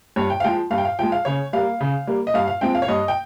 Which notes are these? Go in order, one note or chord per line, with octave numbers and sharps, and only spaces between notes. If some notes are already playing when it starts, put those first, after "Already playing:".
G2 C#5
G5
F5
F3 G#3 G5
G2 F5
G5
F5
F3 G#3 G5
F5
C#3 C#5
G3 A#3 F5
C#3
G3 A#3
D#5
G2 F5
F5
F3 G#3 C4 G5
F5
C#5
G2 D#5
G5